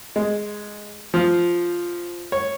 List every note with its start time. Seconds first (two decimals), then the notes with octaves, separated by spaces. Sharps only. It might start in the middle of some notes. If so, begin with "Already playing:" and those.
0.16 G#3
1.14 F3
2.32 C#5